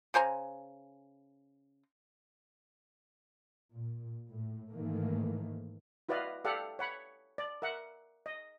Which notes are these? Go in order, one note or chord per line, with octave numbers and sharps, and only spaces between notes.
C#3 C5 G#5 A#5
A#2
A2
G#2 D#3 E3 A3 A#3
E4 F#4 B4 D5 D#5 F5
G4 A4 D5 F5 F#5
C#5 F#5 B5
D5
A#4 E5 F#5
D#5